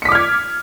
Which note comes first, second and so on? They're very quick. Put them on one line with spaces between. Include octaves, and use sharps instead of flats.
C#7 B6 D6 F6 G#6